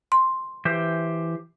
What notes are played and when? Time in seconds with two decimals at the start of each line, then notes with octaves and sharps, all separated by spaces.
0.12 C6
0.65 E3 G4 C5